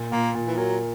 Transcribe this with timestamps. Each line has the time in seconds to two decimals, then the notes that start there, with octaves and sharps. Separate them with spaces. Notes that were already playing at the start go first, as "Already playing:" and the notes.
Already playing: A#2
0.11 A#2 A#3
0.35 A#2
0.48 E3
0.57 F#3 A#3